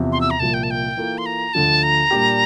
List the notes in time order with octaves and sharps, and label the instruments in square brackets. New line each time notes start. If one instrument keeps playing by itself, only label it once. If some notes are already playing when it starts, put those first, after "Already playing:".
Already playing: [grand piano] E2 C3 F3
[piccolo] C6
E6
A#5
[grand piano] C2 A#2 F3 [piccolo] A5
[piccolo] G5
A5
G5
[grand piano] E3 A#3 F4 A4
[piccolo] C6
A#5
[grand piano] D2 D3 F3 [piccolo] A5
[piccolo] A#5
[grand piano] A#2 G3 D4 G4